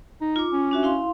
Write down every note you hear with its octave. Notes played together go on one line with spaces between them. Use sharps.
D#4
F4 D6
C#4
D4 F#4 E5
E4 F5 C6